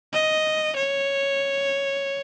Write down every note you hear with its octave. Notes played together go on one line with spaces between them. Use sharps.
D#5
C#5